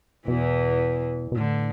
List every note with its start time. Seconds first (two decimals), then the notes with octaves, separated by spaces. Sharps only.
0.27 E2 B2 E3
1.32 B2
1.36 A2 D3